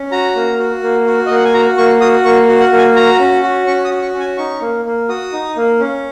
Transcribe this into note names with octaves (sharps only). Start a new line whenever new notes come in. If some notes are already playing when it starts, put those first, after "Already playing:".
Already playing: C#4
F#4 A#5
A#3
F#4
A#3
F#4
A#3 D#5
F#5
G#5
F#4 A#5
A#3 C#6
F#4 D#6
A#3 C#6
F#4
F#5
A#3
G#5
F#4 A#5
C#4
F#4
C#4 C#6
D#6
F#4
C#6
C#4
G#5
D#4 C#6
A#3
A#3
F#4 D#6
D#4
A#3
C#4